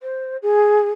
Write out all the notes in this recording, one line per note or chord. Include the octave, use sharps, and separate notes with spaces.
C5
G#4